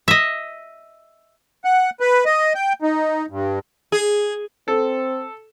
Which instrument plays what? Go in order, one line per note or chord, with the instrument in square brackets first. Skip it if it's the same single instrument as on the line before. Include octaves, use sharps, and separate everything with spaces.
[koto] D#5 E5
[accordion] F#5
B4
D#5
G5
D#4
G2
[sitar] G#4
[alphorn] C4 [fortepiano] A4